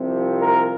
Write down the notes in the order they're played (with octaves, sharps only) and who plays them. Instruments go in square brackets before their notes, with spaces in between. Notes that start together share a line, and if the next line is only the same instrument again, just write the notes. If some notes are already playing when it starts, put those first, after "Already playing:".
Already playing: [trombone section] C2 C3 F3
A#4